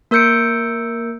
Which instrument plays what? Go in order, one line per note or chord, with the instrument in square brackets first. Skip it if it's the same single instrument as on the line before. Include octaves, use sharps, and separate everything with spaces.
[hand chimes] A#3 A#4 E6 G6 C#7 D7